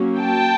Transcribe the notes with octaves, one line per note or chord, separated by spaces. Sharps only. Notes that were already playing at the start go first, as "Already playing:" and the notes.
Already playing: F#3 A#3 C#4
G5 A5